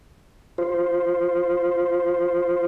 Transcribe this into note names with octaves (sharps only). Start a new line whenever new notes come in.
F4 C5